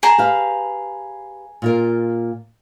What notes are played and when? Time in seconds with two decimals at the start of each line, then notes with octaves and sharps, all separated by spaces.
0.03 G#4 A5 A#5
0.18 G4 B4 F5
1.62 A#2 F4 A#4